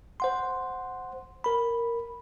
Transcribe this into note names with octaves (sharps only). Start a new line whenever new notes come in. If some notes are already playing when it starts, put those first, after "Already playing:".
C5 F#5 C6
A#4 B5